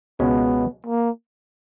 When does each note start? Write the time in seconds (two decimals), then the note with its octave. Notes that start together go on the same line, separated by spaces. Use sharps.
0.20 C#2 B2 G#3 B3 C#4
0.86 A#3